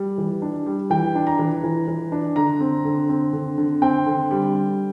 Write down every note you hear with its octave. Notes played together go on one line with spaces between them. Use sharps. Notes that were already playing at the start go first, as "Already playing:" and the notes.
Already playing: G3
E3
D4
G3
E3 G5
D4
A#5
E3
E3
E3
D4
D3 A#5
C4
D3
C4
D3
D3
C4 G5
D3
G3
G3